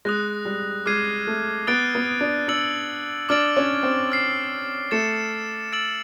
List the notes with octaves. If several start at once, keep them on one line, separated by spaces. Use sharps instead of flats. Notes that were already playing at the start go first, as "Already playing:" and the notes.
G#3 D#6 F#6 A#6
G3
G#3 D6 F6 G#6 C7 D#7
A3
B3 D#6 F#6 A6 D7 G7
B3
D4
D4 E6 A6 C#7 F#7
D4 D6 F6 A6 D7 F#7
C#4
C4
D6 F6 A6 C7
A3 A6 C#7 E7
E6 A6 D7 F#7